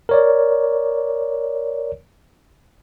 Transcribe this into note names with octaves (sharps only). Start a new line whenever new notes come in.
A#4 C#5 D5